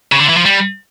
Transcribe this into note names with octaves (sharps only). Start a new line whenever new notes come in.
C#3
D3
E3
F3
G3